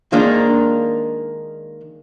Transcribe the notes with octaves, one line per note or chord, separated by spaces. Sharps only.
D#3 G#3 A#3 D4 D#4 F4